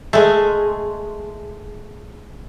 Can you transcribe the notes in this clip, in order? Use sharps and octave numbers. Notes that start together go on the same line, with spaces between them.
G#3 A3